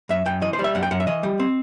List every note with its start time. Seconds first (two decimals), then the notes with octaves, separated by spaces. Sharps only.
0.09 F#2 E5
0.26 F#2 G5
0.42 E3 D#5
0.53 C5
0.59 G3
0.64 E5
0.75 F#2 F#5
0.83 G5
0.91 F#2 F#5
1.00 E5
1.07 E3 D#5
1.23 G3
1.39 C4